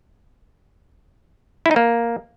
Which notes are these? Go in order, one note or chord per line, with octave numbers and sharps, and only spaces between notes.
E4
D#4
A#3